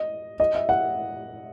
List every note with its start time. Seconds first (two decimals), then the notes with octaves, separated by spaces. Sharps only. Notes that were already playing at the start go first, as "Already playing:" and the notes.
Already playing: D#5
0.40 D#5
0.55 E5
0.69 F#5